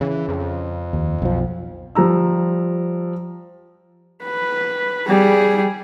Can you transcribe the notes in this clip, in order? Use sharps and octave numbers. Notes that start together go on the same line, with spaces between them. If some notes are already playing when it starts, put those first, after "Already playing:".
C#3 E3
F2
D#2
B1 F3
F3 G3 A#5 E6
B4
G3 G#4